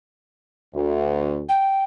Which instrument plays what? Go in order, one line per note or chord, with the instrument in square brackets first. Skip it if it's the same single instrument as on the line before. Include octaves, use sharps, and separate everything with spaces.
[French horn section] D2
[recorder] G5